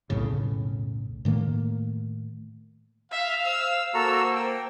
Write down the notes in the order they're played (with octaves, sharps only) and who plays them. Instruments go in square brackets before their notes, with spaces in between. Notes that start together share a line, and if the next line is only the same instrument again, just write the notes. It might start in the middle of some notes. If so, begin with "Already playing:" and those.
[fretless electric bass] B1 F2 A2 C#3
A2 D#3 A3 A#3
[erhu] E5 [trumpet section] F5
[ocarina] C5 [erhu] E6
[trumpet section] A#3 [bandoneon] F#4 A4 A#5 [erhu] E6
[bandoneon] G5